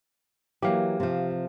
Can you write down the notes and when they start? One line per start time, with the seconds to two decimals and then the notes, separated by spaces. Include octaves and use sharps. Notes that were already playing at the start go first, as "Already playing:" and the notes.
0.62 E3 F#3 A#3 G4 F5
1.00 C3 F3